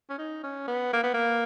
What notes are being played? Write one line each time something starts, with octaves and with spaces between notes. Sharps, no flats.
C#4
D#4
C#4
B3
A#3
B3
A#3